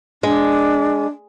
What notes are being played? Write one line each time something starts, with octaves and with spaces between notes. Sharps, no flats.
G#3 D4